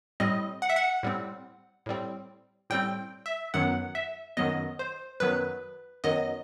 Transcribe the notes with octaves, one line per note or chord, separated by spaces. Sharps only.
A2 G3 C4 D#5
F#5
E5
F#5
A2 G3 C4
A2 G3 C4
A2 G3 C4 G5
E5
F#2 D#3 F#3 B3 F#5
E5
F#2 D#3 F#3 B3 D#5
C5
F#2 D#3 F#3 B3 B4
F#2 D#3 F#3 B3 D#5